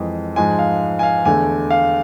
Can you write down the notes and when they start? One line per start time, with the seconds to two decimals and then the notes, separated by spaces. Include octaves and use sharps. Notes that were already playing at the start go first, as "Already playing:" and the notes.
Already playing: F2 E3 G#3
0.36 G#2 F3 G#3 G#5
0.59 F5
0.99 G#5
1.03 F5
1.25 E2 D3 A3 G#5
1.71 F5